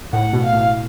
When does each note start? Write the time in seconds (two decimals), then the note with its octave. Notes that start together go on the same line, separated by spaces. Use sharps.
0.12 A2 F#5
0.33 B2
0.43 F5
0.53 A2